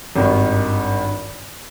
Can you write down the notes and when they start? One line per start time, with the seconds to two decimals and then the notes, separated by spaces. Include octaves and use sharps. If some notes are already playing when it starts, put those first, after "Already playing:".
0.16 G#1 G2 D#3